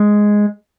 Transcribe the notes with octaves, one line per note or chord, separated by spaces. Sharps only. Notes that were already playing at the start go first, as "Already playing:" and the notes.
Already playing: G#3